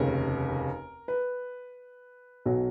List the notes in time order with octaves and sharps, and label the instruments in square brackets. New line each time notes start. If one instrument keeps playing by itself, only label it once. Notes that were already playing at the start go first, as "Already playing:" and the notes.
Already playing: [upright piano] F1 D#2 C#3 A#4
B4
B1 B2 F#3